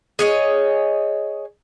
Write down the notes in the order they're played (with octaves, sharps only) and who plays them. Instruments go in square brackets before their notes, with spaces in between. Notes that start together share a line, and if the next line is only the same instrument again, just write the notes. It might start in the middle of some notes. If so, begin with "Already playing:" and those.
[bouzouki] G#4 C#5 D#5